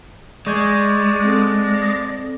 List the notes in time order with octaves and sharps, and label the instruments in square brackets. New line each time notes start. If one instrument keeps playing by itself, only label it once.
[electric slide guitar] G#3 [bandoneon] D5 [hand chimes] C#6 G6 G#6
[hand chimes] C4 A4